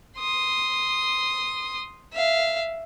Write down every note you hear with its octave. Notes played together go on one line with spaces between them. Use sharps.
C6 D#6
E5 F5